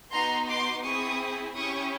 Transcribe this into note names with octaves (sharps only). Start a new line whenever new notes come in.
B3 D#4 F#4 A#5 C6
C6 D6
C4 E4 G#4 C#6 D#6
C#4 E4 G4 C#6 D#6